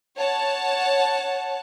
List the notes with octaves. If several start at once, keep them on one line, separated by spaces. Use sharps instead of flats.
C#5 F#5 A5